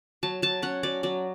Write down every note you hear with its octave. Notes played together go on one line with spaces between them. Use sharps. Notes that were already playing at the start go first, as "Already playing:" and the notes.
F#3 A5
F#3 A5
C#4 F#5
F#3 D5
F#3 D5